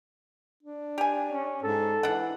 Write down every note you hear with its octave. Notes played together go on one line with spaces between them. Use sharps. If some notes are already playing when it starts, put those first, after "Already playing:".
D4
G4 G#5
C#4
G#2 A4
E3 D4 F#5